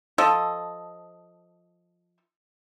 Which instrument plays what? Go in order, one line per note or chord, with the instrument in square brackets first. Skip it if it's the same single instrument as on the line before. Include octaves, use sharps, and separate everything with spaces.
[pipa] F3 A4 D#5